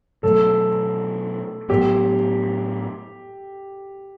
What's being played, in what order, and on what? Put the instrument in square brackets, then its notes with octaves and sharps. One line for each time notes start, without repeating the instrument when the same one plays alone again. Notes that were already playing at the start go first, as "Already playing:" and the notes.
[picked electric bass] B2 F#3 A3 [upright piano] A4
[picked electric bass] A2 F#3 B3 [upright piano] G4